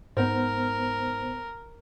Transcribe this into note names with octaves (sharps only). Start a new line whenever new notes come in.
G#2 B3 A#4 C5